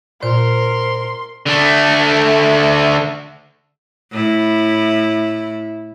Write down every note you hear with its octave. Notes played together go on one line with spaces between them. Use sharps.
A#2 A#4 C5 C6
D3 A3
A2 E4